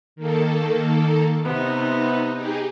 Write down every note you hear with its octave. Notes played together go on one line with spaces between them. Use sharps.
D#3 A#3 A4
C3 B3 D#4
D#4 G4 G#4